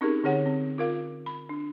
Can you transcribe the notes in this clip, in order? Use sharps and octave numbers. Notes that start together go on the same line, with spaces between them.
C4 C#4 D#4 G4 G#4 A#4
D3 C4 G#4 C#5 F#5
C4
F4 A#4 F5
B5
D4